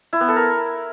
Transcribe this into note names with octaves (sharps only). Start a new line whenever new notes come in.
E4
B3
A4
A#4